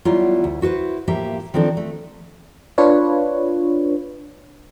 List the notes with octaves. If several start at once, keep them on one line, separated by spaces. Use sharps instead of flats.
F#3 G3 B3 E4 F4
D2
E4 F#4 G4 B4 C5
A2 F3 A#3 G4 E5
D#3 F3 C4 D4 A4
A3
D4 F4 B4 C#5